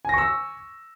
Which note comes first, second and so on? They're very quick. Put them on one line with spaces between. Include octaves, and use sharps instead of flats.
G#5 A#6 C#6 E6